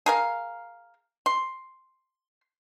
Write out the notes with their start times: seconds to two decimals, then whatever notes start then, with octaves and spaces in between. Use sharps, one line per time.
0.06 G#4 A#4 F5
1.26 C6